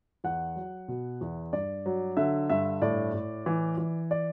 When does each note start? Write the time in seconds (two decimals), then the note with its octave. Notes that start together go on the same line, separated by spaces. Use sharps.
0.24 E2 F#5
0.56 F#3
0.88 B2
1.21 E2
1.53 G2 D5
1.86 F#3
2.17 D3 E5
2.50 G2 E5
2.82 A2 D5
3.14 A2
3.46 E3
3.78 E3
4.11 D5